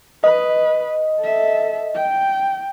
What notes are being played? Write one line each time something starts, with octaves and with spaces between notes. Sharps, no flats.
B4 D#5
A4 E5
G5